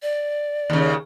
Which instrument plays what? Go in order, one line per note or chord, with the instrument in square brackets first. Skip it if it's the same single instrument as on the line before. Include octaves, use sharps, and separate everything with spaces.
[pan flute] D5
[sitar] D#2 C#3